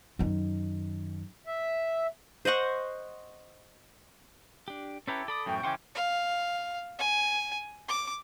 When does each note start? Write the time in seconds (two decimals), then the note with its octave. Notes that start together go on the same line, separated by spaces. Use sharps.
0.19 F#2 D#3
1.46 E5
2.45 C5 D#5 F#5 C#6
4.68 D4 G4
5.07 C#4 E4 G4 A4 B4 A#5
5.28 A4 D5 B5 D6 D#6
5.46 F#2 A2 E3 G5 C#6
5.63 C#3 E3 C#4 F#5 C6 D6
5.95 F5
6.99 G#5
7.88 D6